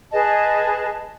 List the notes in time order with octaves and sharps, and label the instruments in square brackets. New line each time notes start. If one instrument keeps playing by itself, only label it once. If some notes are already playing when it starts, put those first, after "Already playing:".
[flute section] G#4 B4 D#5 A5